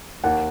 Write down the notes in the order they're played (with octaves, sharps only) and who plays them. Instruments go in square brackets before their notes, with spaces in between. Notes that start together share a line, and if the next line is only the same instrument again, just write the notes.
[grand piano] D#2 D#3 A#3 [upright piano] F#5